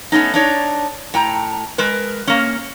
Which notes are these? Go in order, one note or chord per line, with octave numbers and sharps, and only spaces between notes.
A3 B3 C#4 D#4
D4 D#4 C#5
A2 G5 A#5
G#3 A#4 B4
A#3 C#4